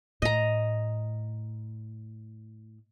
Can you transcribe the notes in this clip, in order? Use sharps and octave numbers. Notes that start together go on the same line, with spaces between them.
A2 D#5 A#5